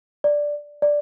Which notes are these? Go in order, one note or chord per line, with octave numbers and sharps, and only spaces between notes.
D5
D5